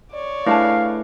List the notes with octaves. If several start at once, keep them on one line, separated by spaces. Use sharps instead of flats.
C#5 D5
A3 D4 E4 G#4 B4 F5 A5